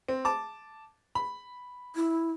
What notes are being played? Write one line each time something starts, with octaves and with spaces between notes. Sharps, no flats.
C4
A5 D6
B5
E4